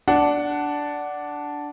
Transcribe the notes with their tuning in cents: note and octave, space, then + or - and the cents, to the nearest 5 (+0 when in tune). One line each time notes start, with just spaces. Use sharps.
D4 -5 F#5 +10